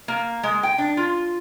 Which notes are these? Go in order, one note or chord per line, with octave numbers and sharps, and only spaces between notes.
A#3
G#3
G5
D4
F4